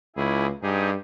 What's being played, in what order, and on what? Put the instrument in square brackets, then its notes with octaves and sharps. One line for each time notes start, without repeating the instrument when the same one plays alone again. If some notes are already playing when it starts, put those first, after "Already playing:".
[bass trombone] C#2 [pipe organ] E4 G#4
[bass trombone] G2 [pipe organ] D#4 G4 G#4